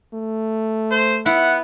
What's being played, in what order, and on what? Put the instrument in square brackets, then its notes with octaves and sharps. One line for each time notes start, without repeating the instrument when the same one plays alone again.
[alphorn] A3
[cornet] C5
[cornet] B3 [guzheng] E4 [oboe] F#5